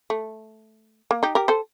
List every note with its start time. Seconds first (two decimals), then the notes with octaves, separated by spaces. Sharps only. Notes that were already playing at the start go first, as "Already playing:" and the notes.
0.10 A3
1.11 A#3
1.23 D#4 G4
1.35 G4 A#4
1.48 A4 C5